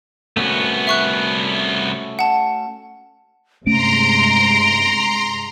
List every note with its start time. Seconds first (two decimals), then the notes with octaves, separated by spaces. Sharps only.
0.37 C2 A3 B3 C#4 F#4
0.87 E5 C#6 F#6
2.19 F#5 A5
3.66 G2 C3 G#3 A3 C#4 A#5 C6 D7